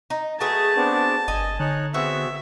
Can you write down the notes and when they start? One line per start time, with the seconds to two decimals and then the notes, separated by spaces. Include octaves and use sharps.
0.10 D#4
0.40 A3 F#4 G#4 B4 A5
0.76 B3 C4 D4
1.28 G1 D#5 G#5
1.60 D3 D#4 C#5 F#6
1.94 B3 C4 F#4 G#4 E5